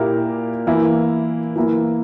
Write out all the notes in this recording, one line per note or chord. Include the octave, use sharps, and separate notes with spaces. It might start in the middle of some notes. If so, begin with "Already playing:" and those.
Already playing: A#2 A#3 E4 G4 A#4
E3 A#3 E4
E3 A#3 E4